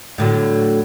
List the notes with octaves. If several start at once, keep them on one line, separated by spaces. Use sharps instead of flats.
A2 D3 F#3